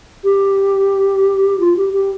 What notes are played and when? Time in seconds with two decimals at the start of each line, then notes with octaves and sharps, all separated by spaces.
0.24 G4
1.60 F4
1.77 G4
1.93 G4